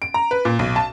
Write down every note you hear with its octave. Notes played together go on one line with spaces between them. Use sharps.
D7
A#5
B4
A#2
B1
A5